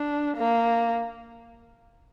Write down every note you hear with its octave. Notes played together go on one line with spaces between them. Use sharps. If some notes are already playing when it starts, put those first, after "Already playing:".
Already playing: D4
A#3